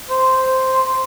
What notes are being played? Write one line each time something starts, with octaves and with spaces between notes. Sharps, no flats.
C5